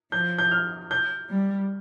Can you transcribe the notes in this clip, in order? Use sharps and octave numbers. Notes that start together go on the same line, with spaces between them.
F3 G6
G6
F6
G6
G3